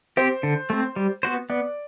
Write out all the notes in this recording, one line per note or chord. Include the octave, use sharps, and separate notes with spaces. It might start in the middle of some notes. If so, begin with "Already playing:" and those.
C4 G4 C5
D3
A3 C4
G3
B3 F#4 C5
B3 D5